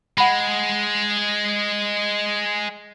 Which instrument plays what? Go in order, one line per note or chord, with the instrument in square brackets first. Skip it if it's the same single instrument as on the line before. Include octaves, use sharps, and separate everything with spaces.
[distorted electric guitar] G#3 [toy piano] F#5 B5